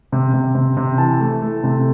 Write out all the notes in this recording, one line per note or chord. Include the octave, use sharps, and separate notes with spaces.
C3
C3
C3
C3
E3 A5
A3
A3
C3